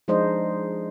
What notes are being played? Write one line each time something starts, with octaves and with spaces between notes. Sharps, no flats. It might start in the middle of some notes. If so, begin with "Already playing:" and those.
F3 G#3 D4 D#4 C5 D#5